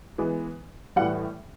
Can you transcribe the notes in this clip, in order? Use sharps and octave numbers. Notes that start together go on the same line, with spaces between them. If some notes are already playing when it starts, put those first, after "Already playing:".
E3 G#3 B3
A2 E3 G3 F#5